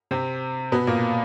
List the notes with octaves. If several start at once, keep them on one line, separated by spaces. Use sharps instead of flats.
C3 C4
B2 B3
A#2 A#3